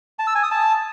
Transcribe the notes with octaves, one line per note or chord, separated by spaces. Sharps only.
A5
E6
G#5
D#6
A5